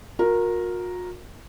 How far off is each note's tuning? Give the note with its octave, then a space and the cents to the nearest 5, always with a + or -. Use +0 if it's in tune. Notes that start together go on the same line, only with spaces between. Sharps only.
F#4 -45 A#4 +0